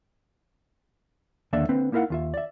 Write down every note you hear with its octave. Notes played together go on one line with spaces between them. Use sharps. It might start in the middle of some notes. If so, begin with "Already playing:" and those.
D#2 D3 A#3 D5 E5
D3 A#3 C4 B4
A#3 D#4 E4 A#4 F5 F#5
D#2 F4 E5
D5 E5